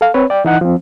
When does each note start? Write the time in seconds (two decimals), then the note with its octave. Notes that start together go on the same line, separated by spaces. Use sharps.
0.01 A4 F5
0.14 C4 B4 C#5
0.30 D5 G5
0.45 E3 D#4 F#5 F#6
0.61 F3 C4